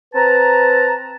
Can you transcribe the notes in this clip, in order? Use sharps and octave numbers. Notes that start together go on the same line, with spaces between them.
C4 B4 A5 A#5